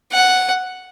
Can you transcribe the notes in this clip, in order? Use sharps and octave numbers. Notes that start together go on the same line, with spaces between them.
F#5